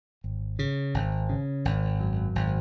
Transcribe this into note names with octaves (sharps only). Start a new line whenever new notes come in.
G#1
C#3
G#1
C#3
G#1
F#2
G#1